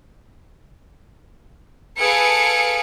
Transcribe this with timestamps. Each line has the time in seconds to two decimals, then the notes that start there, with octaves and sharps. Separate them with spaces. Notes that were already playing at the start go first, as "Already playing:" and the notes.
1.98 G#4 A4 B4 F5 C#7 D7